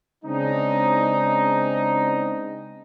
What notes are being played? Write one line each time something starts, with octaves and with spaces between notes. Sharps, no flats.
C#3 G#3 C4 D4 D#4